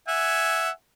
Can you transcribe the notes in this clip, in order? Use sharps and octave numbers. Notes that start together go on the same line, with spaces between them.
E5 F#5 G#5